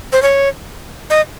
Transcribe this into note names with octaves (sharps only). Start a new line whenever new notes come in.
C5
C#5
D#5